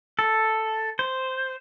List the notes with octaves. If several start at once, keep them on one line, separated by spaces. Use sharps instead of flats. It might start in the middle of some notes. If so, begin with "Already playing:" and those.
A4
C5